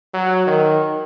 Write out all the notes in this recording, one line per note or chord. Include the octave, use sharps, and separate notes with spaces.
F#3
D#3